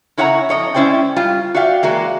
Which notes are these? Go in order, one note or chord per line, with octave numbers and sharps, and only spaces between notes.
C#3 E4 C#5 F#5 A5 A#5
F2 C#5 D#5
G#3 C#4 E4 C5 D5 G5
G3 F4
F#4 D5 E5 F5 G5
E3 G#3 A#3 F#4